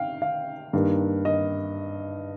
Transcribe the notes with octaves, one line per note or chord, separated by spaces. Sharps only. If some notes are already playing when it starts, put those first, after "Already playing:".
Already playing: F5 G5
F5
G2 D#3 A#3
D#5